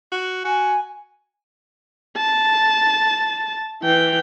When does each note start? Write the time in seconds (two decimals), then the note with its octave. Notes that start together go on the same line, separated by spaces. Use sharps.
0.12 F#4
0.45 F#4 G#5
2.17 A5
3.83 E3 G5